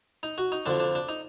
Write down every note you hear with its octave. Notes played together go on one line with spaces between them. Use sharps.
D#4
F#4
D#4
F2 D3 F3 D4
D4
D4
D#4